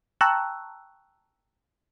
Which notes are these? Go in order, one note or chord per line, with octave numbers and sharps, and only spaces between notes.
G5 A5 A#5 C#6 E6 F#6